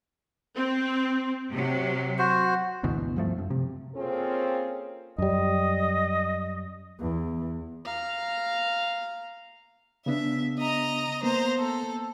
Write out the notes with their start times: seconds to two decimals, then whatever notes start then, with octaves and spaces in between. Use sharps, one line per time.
0.56 C4
1.51 C3 F#3
2.19 F#4 C5
2.83 G#1 D2 B2 E3
3.16 G2 F3 A3
3.38 F#2
3.50 C3
3.94 A#3 C4 C#4 F4 G#4 A4
5.18 F#2 G3 D#5
7.00 E2
7.85 F5 A#5
10.06 C#3 B3 D4 E5
10.59 D#5 A#5
11.23 A#3 B3 C5 A#5
11.59 A4